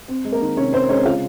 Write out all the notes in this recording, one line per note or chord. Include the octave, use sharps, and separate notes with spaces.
C4
G#3
A#3 A#4
D#3
C3 C#4 C#5
C4 C5
G#3 C#4 C#5
C#3 F4 F5